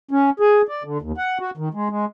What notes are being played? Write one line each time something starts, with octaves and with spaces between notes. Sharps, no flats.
C#4
G#4
D5
D3
D#2
F#5
F#4
D#3
G#3
G#3